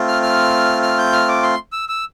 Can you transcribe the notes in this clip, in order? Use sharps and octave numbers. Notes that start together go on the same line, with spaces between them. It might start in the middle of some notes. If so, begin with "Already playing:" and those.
Already playing: A3 C4 F4
F6
F6
F6
G6
F6
D6
C6
E6
E6